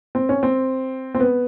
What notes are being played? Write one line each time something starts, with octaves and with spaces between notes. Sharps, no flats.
C4
C#4
C4
C4
B3